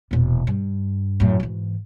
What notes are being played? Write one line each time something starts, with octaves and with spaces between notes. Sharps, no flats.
E1 A#2
G2
F#2 A2
G#2 E3